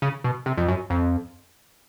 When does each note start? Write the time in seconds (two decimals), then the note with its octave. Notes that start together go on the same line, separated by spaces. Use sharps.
0.02 C#3
0.24 B2
0.46 C3
0.57 F2
0.68 F#2
0.90 F2